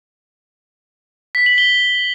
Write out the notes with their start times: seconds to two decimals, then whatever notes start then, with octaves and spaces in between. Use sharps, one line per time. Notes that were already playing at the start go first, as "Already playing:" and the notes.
1.35 B6
1.46 F#7
1.58 G7